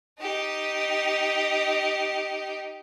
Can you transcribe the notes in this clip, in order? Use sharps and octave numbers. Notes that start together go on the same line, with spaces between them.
D#4 G4